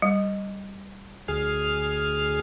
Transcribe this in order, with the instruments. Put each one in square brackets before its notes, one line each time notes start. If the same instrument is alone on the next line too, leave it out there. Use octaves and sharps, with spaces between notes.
[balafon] G3
[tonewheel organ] D2 G#4 F6